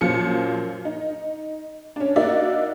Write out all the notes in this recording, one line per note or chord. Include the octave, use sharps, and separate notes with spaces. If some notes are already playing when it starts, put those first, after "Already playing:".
F#2 A#2 F3 C#7
D#4
C#4 D4
A#3 D#4 F#4 D5 E5